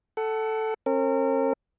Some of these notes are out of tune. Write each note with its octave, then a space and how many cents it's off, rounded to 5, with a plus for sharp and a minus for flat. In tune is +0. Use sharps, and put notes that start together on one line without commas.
A4 +0 F#5 +25
C#4 -45 A#4 -35